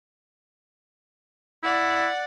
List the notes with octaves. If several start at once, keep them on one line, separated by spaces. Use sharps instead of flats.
E4 D5 F#5